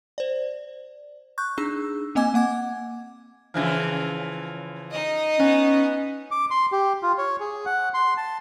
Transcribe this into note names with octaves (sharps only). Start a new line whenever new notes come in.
C5 D5
C#6 F#6 G6
D4 D#4 G#4 E6
A#3 C4 D#5 G#5 D6 G#6
A#3 F#5 D6 G#6
C#3 E3 F3
D#4 D#5
B3 C#4
D6
C6
G4
F4
C#5
G#4
F#5
C6
A5